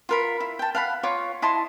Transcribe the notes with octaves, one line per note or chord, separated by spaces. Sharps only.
F4 A#4 B5
E4
G5 A5
F5 F#5 B5
F4 C#5 C#6 D6
E4 D#5 A5 C6